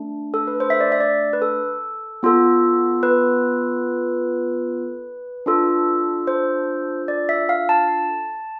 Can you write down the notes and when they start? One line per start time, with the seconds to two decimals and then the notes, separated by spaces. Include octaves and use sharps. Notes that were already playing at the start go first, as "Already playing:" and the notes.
Already playing: A3 D4
0.34 A4
0.47 B4
0.60 C5
0.70 E5
0.81 D5
0.92 E5
1.00 D5
1.33 B4
1.42 A4
2.23 B3 F4 A4
3.03 B4
5.46 D4 F4 A4
6.27 C5
7.08 D5
7.29 E5
7.49 F5
7.69 A5